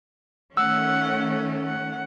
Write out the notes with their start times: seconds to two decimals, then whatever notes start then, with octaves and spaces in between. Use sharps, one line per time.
0.57 D#3 A3 C#4 F#5 E6
1.65 F#5